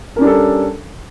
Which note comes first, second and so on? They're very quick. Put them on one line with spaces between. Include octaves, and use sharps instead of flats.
A#4 C#4 D4 G3 A4